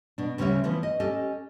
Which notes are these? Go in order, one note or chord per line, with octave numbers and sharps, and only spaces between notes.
B2 D4
D2 C#3 G3 C#4 C#5 E5
E3 F3 A3 B3
D#5
C#4 G4 A4 D#5